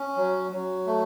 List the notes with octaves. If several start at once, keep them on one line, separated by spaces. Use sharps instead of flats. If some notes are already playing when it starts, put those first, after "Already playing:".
Already playing: C#4
F#3
F#3
A3